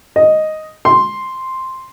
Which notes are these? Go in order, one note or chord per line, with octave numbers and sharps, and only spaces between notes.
D#5
C6